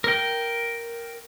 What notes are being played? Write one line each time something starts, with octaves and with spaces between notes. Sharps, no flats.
A#4 G5